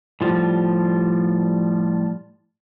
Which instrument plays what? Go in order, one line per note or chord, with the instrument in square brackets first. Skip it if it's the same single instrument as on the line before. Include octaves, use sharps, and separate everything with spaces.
[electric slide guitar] A2 F3 G3